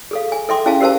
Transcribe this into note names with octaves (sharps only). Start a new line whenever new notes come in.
G#4 A4 F5
G#5
A4 E5 G5 C6 D6
C#4 E4 G#4 F5 G#5 A5
G4 A#4 C5 F5 A5